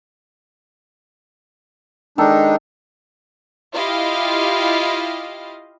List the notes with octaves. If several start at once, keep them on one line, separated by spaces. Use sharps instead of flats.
D#3 G#3 D4 D#4 A4
E4 F4 G4 D#5 F5